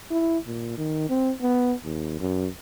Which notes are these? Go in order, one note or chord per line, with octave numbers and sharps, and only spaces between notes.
E4
A#2
D#3
C4
B3
D#2
F#2